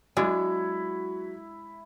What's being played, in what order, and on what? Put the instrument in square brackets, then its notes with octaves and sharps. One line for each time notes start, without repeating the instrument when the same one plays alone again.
[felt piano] F#3 F#4 [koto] G#3 D4 [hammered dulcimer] E4